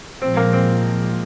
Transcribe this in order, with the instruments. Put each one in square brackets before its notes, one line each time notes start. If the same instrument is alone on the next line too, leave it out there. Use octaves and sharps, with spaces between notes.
[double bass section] A#2 F3 G#3 [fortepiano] C4
[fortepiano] A#3
C4